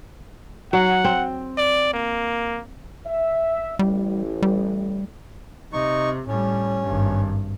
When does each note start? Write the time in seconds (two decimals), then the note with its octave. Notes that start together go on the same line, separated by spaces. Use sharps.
0.73 F#3 F#5
1.04 C4
1.58 D5
1.94 A#3
3.06 E5
3.79 A1 G3
4.42 G3
5.73 C3 D#4 C#6
6.28 A2 G3 C#4
6.83 G#1 G2